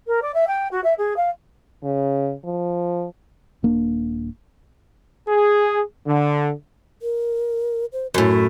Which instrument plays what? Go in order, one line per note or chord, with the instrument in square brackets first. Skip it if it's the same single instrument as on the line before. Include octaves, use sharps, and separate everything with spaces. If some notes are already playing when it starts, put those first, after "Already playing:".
[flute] A#4
D5
E5
G5
F#4
E5
G#4
F5
[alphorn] C#3
F3
[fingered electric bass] D#1 A#3 D4
[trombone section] G#4
D3
[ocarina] A#4
C5
[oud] F#2 A2 [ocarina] F#4